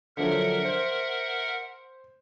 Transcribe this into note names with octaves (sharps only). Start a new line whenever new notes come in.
D3 F3 F#3 A#4 E5 F#5
C5